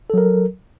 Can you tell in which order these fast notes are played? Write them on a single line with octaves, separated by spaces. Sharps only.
A4 F#3 A#4